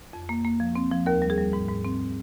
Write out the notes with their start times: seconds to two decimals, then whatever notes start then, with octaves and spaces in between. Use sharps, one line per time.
0.13 F2
0.29 A#3
0.45 A#3
0.60 F3
0.76 C4
0.91 F3
1.06 D#2 A#4
1.22 G3
1.30 G#4
1.38 G3
1.53 G#2
1.69 G#2
1.85 C4